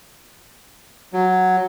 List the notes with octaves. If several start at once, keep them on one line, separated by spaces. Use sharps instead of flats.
F#3